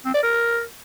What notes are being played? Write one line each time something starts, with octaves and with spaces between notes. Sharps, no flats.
C4
D5
A#4